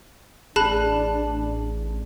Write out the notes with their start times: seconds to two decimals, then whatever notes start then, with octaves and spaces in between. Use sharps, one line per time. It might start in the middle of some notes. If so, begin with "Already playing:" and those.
0.56 A1 D4 G#4 A5 B5 F#6